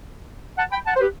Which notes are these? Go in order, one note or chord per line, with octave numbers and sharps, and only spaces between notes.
F#5 A5
G5 B5
F#5 A5
C5
G4 B4